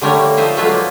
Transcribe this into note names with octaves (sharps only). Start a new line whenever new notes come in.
D3 G3 A3 A#4 C#5
A#3
F3 D#4 F4 C5 E5
F#3 G#3 A3 F4 B4 E5
F3 A#3